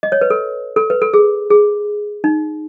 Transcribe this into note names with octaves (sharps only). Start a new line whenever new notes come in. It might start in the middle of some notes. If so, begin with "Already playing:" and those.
D#5
C#5
B4
A4
A4
B4
A4
G#4
G#4
D#4